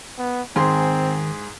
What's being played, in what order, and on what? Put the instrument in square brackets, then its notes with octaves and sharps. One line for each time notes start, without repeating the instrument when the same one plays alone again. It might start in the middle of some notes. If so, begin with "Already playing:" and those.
[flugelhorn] B3
[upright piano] G#2 G#4 C6 [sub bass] D#3 [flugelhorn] C4